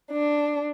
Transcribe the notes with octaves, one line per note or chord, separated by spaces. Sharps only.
D4